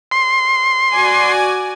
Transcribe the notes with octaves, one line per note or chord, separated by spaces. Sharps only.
C6
F#4 D5 G#5